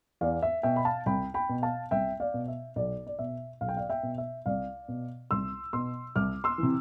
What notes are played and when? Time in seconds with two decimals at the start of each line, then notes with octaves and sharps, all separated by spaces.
0.21 E2 D5 F5
0.43 E5
0.63 B2 E5 G5
0.76 B5
0.85 F5 A5
1.06 C2 G5 B5
1.34 G5 B5
1.49 B2
1.62 F5 A5
1.91 C2 E5 G5
2.20 D5 F5
2.34 B2
2.48 E5
2.76 B1 D5
3.07 D5
3.19 B2 E5
3.61 B1 F5
3.69 G5
3.77 D5 F5
3.89 E5 G5
4.03 B2
4.18 E5
4.46 C2 D5 F5
4.88 B2
5.31 C2 C6 E6
5.73 B2 C6 E6
6.16 C2 D6 F6
6.44 C6 E6
6.58 C3 E3